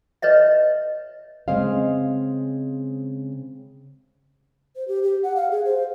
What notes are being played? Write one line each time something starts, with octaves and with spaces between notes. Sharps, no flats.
B4 C#5 D#5 E5
C#3 G#3 C4 C5 D#5 F5
C5
G4
G4
F#5
F5
G#4
C5